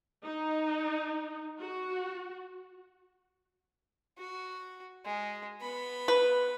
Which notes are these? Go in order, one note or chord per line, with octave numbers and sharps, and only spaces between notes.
D#4
F#4
F#4
G#3
B3 B5
B4